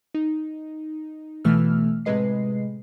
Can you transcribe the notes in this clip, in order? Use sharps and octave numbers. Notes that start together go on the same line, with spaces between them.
D#4
B2 E3 A3 E6 F6
A2 C3 G#3 B4 D#5 C7